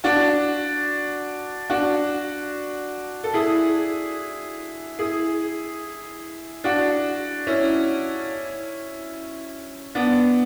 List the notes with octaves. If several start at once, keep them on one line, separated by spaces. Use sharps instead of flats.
D4 F#4
D4 F#4
A4
E4 G#4
E4 G#4
D4 F#4
C#4 E4
B3 D4